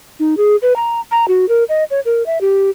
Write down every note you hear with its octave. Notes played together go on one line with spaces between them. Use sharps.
D#4
G#4
B4
A#5
A#5
F#4
A#4
D#5
C#5
A#4
E5
G4